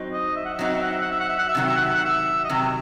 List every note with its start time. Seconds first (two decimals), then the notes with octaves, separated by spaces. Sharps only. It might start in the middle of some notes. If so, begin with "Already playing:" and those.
Already playing: F#3 C4 D#4
0.12 D#5
0.36 E5
0.45 F#5
0.54 E5
0.59 F#3 C4 D#4 F#5
0.73 E5
0.82 F#5
0.92 E5
1.01 F#5
1.11 E5
1.20 F#5
1.29 E5
1.38 F#5
1.48 E5
1.55 C3 D#3 F#3 F#5
1.66 E5
1.76 F#5
1.85 E5
1.95 F#5
2.04 E5
2.44 D#5
2.49 C3 D#3 F#3 E5